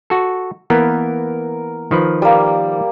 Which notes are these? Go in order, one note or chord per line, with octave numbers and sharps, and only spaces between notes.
F#4 A4
E3 A#3 B3 A#4
D#3 F3 B4
G3 A#3